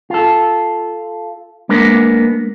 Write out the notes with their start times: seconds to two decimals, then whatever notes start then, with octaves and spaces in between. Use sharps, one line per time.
0.10 F4 A4
1.69 G#3 A#3 B3 D4 A#4